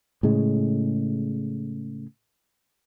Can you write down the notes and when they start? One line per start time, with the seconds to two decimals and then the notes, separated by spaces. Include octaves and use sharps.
0.23 A2 C#3 G#3